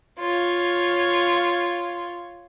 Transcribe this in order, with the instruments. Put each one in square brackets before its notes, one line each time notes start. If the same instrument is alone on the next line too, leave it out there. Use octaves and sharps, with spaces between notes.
[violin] F4 C#5